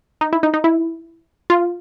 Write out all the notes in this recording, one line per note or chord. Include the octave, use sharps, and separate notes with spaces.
D#4
E4
D#4
D#4
E4
F4